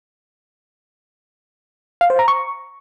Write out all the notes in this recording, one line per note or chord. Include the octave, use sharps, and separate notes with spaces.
F5
C5
A#5
C#6